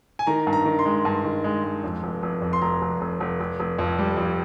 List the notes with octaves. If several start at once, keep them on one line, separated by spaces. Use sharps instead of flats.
G#5
D#3 A#5
G2
A#5
D#3
C6
G#3
G2
D#3
G#3
G#3
F2
F1
F1
F2
C6
F1 A#5
F1
F1
F1
F1
F1
F2
G3
F2